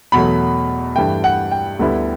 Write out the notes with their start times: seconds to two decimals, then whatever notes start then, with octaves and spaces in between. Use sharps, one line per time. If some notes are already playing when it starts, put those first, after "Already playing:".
0.12 E2 B2 F#3 A3 B5
0.96 G2 E3 A3 G5
1.24 F#5
1.51 G5
1.79 D2 D3 G3 B3 E4